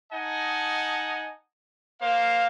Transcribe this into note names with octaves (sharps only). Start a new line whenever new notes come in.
D#4 D#5 F#5 G#5 A5
A#3 C5 F5